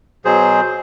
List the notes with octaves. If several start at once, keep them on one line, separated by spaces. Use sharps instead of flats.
B2 F#3 G#4 C5